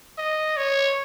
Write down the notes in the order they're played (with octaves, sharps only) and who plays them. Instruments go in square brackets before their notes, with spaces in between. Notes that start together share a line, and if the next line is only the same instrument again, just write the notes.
[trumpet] D#5
C#5